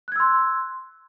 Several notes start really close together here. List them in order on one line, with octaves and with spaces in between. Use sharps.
F#6 G#6 E6 C6